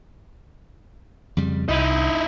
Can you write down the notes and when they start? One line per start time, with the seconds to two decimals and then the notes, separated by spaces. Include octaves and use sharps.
1.37 F2 C#3 G3
1.68 C2 D#4 E4